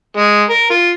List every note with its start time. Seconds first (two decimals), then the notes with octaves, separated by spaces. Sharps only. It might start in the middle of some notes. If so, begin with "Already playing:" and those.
0.17 G#3
0.50 A#4
0.70 F4